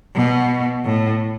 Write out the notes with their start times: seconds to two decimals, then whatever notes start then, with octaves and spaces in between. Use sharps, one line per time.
0.14 B2
0.85 A2